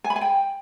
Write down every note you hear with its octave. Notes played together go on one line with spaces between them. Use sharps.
G#5
B5
G#5
G5